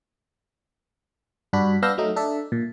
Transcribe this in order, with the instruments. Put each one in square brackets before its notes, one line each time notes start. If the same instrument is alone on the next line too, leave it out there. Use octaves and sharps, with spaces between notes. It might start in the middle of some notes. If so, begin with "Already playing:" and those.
[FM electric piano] G2 D4 F#4 B5
B3 D4 F5 E6 G6 A#6
F#3 A3 D#4
D4 A4 E5
A#2